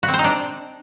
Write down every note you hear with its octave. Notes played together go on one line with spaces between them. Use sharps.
F#4
C4
C5
D#4
D4